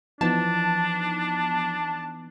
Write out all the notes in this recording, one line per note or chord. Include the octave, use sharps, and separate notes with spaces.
E3 F3 B3 D4 D#4 A5